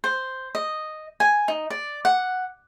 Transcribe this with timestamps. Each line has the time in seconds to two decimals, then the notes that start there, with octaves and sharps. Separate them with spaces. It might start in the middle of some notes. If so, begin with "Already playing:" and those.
0.04 C5
0.55 D#5
1.20 G#5
1.48 D#4
1.70 D5
2.05 F#5